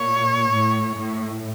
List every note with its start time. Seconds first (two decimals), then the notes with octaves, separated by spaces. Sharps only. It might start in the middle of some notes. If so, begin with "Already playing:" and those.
Already playing: A#2 C#5
0.53 A2
0.96 A2